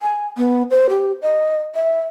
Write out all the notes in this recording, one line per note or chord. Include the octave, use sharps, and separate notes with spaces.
G#5
B3
C5
G4
D#5
E5